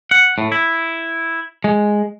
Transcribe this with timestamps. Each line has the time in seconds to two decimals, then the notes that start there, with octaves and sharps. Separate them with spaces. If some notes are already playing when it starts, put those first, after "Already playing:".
0.11 F#5
0.38 A2
0.52 E4
1.64 G#3